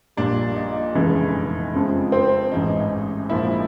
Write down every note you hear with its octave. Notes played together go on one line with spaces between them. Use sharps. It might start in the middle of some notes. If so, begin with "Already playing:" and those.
A#1 A#2 G3 D4
D#4
F1 E2 C#3 E3 G#3
F2 C#3 F3 G#3
C4
A1 G#2 E3 G#3 D#4
A#1 A#2 F3 G#3 E4